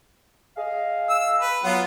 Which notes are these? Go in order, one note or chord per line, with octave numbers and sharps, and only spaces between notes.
G#4 D#5 F5
E6
B4
F#3 B3 F4 F#5